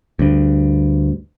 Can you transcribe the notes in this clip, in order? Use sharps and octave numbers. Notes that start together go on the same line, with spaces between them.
D2 G2